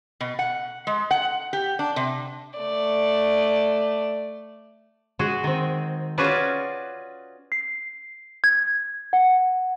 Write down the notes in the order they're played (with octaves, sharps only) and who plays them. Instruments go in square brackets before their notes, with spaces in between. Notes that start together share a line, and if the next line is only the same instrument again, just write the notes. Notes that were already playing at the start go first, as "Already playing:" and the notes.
[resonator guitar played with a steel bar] B2
F#5
G#3
F#5
G4
D4
C3
[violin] A3 D5
[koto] G#3 F#4 G#4
D#3 C4
C#4 F4 F#4 G#4 B4 D5
[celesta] C7
G#6
F#5